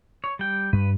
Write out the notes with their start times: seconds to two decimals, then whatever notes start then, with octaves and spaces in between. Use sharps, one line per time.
0.24 C#5
0.39 G3 G5
0.73 G2 G3 B4